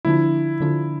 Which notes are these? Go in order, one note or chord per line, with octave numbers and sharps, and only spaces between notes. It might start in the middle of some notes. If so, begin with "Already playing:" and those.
D3 F3 A#3 D4 E4 F4
D3 F3 A#3 D4 F4